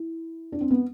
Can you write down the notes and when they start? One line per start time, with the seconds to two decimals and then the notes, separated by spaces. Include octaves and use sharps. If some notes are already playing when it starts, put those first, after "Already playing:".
Already playing: E4
0.52 D4
0.61 C4
0.70 B3